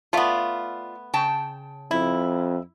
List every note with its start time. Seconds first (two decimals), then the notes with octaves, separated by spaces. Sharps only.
0.13 A3 B3 F4 D5 F5
1.14 C#3 G5 A5
1.91 F2 E4